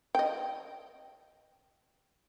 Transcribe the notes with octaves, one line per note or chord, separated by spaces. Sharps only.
D#5 G5